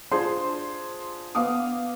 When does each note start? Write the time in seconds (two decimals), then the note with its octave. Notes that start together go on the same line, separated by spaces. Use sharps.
0.11 D4 F4 G#4 C5 C6
1.35 B3 F5 D6 D#6